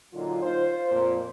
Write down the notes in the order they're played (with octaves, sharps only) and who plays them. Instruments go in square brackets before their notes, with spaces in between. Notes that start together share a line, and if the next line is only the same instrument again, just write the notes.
[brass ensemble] A#2 D3 F#3 D#4 F4
F4 C5
F2 A#2